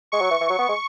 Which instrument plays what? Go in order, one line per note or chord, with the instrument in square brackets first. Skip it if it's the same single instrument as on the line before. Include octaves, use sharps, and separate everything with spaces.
[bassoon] G#3 [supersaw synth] C#6
[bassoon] F#3
E3
E3
F#3
B3
G#3